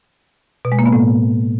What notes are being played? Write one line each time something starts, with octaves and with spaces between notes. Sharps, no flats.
B2
G#3
A#3
B3
A2